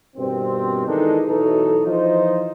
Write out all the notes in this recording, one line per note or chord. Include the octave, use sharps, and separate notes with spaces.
G2 B2 D#3 C4
D#3 E3 G#3 D4 D#4 A4
B1 E3 F#3 D#4 A4
E3 F3 D#4 F4 C5 D#5